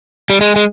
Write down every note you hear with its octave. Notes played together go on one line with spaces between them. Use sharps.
G3
G#3
G#3